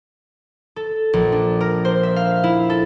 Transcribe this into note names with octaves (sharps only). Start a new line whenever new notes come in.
A4
A#1
D4
A#4
C5
E5
F5
E4
A4